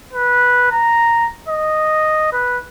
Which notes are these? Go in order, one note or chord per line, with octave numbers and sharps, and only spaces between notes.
B4
A#5
D#5
B4